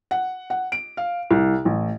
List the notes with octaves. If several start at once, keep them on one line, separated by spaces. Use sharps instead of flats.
F#5
F#5
D7
F5
C2
A1